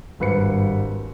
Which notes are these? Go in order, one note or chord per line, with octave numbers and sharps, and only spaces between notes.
G#1 G2 B4 C#7